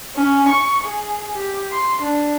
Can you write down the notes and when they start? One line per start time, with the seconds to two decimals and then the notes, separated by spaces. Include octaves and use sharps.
0.16 C#4
0.48 C#6
0.84 G#4
1.35 G4
1.71 C6
2.02 D4